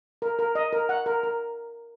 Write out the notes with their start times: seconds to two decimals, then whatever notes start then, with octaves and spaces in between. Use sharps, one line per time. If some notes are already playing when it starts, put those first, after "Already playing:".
0.22 A#4
0.39 A#4
0.55 D#5
0.73 A#4
0.89 F#5
1.06 A#4
1.23 A#4